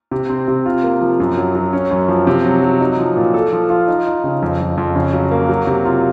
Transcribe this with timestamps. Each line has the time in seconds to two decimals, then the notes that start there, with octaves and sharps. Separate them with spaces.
0.11 C3
0.30 C4
0.48 C3
0.66 F4
0.83 A#3
1.01 F3
1.20 F#2
1.37 F#3
1.55 F#3
1.73 C#4
1.91 F#2
2.08 F3
2.27 C3
2.45 F#3
2.63 F#3
2.81 D#4
2.99 F3
3.16 A#2
3.34 A4
3.53 F3
3.70 F4
3.88 D#4
4.07 D#4
4.24 C#3
4.42 F2
4.60 F2
4.77 F2
4.96 C#3
5.13 F#3
5.31 A#3
5.49 F#3
5.67 C3
5.85 F4